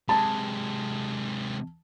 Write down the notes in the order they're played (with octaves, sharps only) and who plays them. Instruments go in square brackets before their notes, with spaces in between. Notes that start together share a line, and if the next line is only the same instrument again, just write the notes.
[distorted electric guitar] C3 G#3 [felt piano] A5